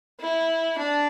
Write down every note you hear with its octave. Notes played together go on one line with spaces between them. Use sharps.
E4
D4